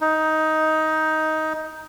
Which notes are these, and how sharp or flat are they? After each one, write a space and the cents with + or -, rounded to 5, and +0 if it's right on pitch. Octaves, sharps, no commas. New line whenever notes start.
D#4 +10